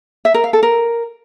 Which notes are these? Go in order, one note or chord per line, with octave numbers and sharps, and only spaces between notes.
E5
A#4
F5
A4
A#4